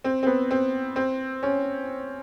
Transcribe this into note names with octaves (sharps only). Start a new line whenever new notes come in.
C4
C4
B3
C4
C4
C#4